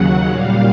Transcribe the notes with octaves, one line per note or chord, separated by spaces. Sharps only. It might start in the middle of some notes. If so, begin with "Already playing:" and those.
Already playing: D#2 C#3 F#3 F#5
A#2 G3 F5